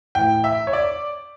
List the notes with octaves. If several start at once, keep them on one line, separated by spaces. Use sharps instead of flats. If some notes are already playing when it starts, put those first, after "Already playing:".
A2 E3 G5
E5
C#5
D5